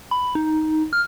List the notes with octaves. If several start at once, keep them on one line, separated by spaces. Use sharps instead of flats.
B5
D#4
F6